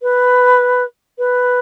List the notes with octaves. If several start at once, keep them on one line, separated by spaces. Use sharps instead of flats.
B4
B4